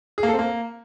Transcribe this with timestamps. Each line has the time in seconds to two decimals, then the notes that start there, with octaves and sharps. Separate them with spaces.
0.18 G#4
0.23 A#3
0.28 A4
0.34 C4
0.39 A#3